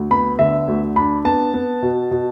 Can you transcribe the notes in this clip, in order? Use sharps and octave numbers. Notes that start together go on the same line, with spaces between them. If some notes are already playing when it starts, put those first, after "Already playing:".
Already playing: D2
B3 B5
D3 E5
D2
D4 B5
B3 A5
B3
B2
B2